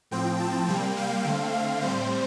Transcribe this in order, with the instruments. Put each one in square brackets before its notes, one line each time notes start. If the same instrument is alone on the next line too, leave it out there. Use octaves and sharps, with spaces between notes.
[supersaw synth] A2 F3 C4 G5
A5
C3 G3 A#3 G5
F5
D3 A3 C4
F5
A2 G3 C4 C5